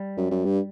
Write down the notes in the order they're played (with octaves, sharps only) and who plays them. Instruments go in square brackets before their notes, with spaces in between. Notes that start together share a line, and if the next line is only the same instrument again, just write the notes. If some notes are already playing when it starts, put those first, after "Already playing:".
Already playing: [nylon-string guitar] G3
[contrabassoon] F#2
F#2
G2